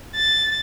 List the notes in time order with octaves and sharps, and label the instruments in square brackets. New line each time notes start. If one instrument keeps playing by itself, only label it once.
[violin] A6